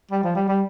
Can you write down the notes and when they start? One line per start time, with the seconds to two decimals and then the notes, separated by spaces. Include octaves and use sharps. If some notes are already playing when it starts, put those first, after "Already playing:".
0.12 G3
0.24 F3
0.36 G3
0.49 G3